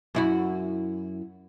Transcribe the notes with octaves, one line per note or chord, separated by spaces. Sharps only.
F#2 E4 F#4